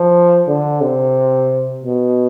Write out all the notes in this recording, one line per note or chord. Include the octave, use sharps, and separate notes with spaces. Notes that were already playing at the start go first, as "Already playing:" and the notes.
Already playing: F3
D3
C3
B2